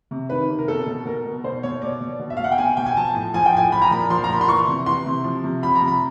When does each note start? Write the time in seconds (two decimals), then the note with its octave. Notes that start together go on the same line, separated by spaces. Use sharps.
0.11 C3
0.29 D#3 B4
0.49 C3
0.59 A#4
0.68 B2 A4
0.87 B2
1.06 B2 A#4
1.25 B2
1.44 B2 C5
1.63 B2 C#5
1.82 B2 D5
2.01 B2
2.20 B2
2.30 E5
2.37 F5
2.39 B2 F#5
2.52 G5
2.58 B2 G#5
2.77 B2 G5
2.86 G#5
2.97 F3 A5
3.15 A2
3.34 F3 G#5
3.46 G5
3.53 A2 G#5
3.72 F3 B5
3.82 A#5
3.91 A#2 B5
4.10 F3 C6
4.24 A#5
4.30 A#2 B5
4.41 C6
4.48 E3 C#6
4.68 C3
4.86 E3 C6
5.06 C3
5.24 F3
5.44 C3
5.63 F3 B5
5.75 A#5
5.82 C3
5.88 B5